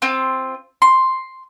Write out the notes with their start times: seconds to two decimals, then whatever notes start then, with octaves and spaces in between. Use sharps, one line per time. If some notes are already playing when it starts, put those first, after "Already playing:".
0.02 C4 F4
0.82 C6